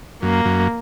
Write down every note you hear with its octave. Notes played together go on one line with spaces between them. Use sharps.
F#2 A#3
F#2